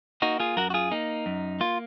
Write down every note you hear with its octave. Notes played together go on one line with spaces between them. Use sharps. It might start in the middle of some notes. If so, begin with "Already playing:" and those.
A#3 D#4 F#4
F4 G#4
F#2 F#4 A#4
F#4
F4 G#4
A#3 D#4
F#2
A#3 F4